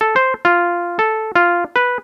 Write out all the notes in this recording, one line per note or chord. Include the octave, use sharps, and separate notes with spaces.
A4
C5
F4
A4
F4
B4